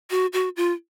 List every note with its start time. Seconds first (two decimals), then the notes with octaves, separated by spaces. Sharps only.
0.10 F#4
0.33 F#4
0.56 F4